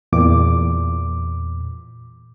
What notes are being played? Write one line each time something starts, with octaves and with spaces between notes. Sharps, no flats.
E2 A#2 D6